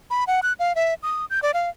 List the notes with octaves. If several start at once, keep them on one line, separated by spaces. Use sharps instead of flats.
B5
F#5
F#6
F5
E5
D#6
G6
D5
F5